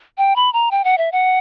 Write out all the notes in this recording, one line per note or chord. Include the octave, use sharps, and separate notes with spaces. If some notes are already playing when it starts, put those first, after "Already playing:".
G5
B5
A#5
G5
F#5
E5
F#5